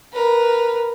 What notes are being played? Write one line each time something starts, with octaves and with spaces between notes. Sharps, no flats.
A#4 B4